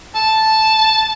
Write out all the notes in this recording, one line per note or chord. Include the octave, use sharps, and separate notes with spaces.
A5